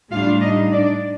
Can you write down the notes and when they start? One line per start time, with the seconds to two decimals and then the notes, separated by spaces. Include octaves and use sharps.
0.11 A2 G3 D4 F4 F5
0.41 D#4 D#5
0.72 D4 D5